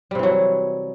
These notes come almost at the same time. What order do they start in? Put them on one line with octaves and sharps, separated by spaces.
G3 C3 E3 F#3